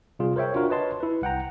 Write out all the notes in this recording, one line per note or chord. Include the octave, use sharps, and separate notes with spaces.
C3 G3 F4 G#4
A#4 C5 C#5 E5 G5
D4 F4 F#4 A#4
B4 C#5 D#5 A5 C6
E4 B4
C2 F#5 G5 A#5